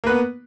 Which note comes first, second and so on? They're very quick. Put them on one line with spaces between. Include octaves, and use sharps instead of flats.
A#3 B4 B3